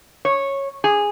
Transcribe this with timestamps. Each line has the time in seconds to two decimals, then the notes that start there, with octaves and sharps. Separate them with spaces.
0.25 C#5
0.84 G#4